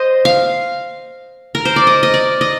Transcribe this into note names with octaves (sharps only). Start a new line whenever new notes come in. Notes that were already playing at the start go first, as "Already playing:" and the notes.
Already playing: C5 D#5
F5
A#4
C5
D5
D#5
D#5
D5
D#5